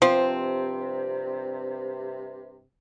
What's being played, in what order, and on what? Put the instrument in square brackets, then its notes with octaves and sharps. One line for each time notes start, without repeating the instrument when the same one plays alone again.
[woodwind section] G2 C3 [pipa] F3 [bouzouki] C4